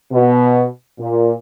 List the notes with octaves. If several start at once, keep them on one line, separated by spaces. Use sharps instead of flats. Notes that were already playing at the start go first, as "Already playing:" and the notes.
B2
A#2